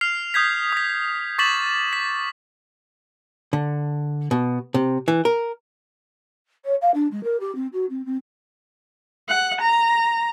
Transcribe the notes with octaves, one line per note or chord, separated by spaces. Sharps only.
F6 C7 F7
D#6 G6 G#6 B6
D#6 B6
C#6 D6 A6 B6 E7 F#7
B6
D3
B2
C3
E3
A#4
C#5
F5
D4
G#3
A#4
G4
C4
F#4
C4
C4
F#5
A#5